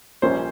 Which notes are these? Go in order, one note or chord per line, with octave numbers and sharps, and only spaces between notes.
A#1 A#2 G3 C#4 C5